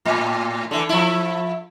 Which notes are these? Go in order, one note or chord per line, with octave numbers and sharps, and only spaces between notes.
A2
D3 E3
F3 E4